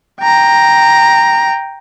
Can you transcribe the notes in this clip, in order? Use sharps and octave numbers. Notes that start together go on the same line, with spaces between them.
G5 A#5